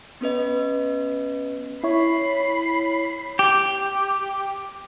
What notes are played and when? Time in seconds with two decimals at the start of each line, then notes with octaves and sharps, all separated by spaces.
0.21 B3 C#4 B4 D#5
1.83 E4 C#5 B5 C7
3.39 G4